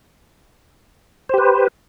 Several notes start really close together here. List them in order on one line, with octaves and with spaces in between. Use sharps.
C5 G4 B4